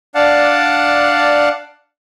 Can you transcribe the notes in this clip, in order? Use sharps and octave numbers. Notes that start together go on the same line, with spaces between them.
D4 D5 F5 F#5 A5